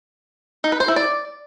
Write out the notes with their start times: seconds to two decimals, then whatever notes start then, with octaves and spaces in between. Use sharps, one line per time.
0.64 D#4
0.72 B4
0.80 C5
0.88 E4
0.96 D5